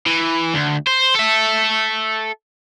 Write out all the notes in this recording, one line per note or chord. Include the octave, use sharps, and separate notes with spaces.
E3
D2
C5
A4 E5